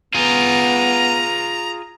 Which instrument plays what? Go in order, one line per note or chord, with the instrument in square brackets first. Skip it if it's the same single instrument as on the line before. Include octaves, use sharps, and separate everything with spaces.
[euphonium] B3 [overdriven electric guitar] F4 G#4 [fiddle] A#5